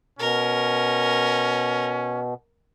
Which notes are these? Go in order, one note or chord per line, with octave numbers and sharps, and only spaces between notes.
B2 C#4 A#4